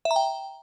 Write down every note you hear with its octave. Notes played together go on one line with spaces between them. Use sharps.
E5
A#5
G5